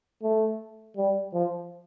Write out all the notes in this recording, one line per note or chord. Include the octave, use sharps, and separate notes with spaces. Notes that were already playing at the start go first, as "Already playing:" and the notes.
A3
G3
F3